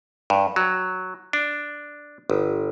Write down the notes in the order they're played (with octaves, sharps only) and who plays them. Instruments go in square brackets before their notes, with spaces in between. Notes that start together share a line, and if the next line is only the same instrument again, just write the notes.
[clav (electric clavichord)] G2
F#3
D4
G1